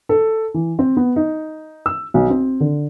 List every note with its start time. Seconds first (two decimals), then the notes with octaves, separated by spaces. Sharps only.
0.09 A4
0.54 E3
0.79 C4
0.97 B3
1.16 D#4
1.86 E6
2.14 B1
2.30 C4
2.60 D3